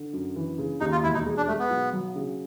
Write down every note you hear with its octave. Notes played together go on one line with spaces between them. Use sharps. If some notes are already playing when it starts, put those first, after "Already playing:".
Already playing: D3
F#2
E3
C#3
D#2 D#4
F4
E1 E4
D#4
G#3
D4
G#3 A3
B3
B1
F#3
C#3